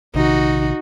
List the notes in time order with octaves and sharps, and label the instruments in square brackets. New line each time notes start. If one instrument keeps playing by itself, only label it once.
[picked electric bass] A#1 C3 D#3 [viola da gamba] D#4 F#4